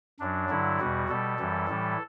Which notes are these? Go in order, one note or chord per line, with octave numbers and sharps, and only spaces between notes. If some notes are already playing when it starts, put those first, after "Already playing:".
F#2 F#3 D4
G2 D3 F#3 E4
E2 B2 G3 F#4
B2 G3 A4
F#2 E3 G3
A2 E3 G3